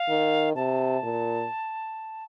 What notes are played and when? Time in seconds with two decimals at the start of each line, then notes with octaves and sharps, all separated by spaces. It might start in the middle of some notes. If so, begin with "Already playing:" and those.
Already playing: F5
0.09 D#3
0.55 C3 A5
1.03 A#2